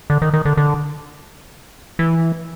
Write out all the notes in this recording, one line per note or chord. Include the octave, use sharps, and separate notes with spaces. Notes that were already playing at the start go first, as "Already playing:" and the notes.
D3
D#3
D#3
D3
D3
E3